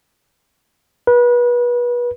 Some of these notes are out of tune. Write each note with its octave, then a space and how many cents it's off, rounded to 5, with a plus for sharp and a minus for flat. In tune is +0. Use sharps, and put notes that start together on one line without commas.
B4 -30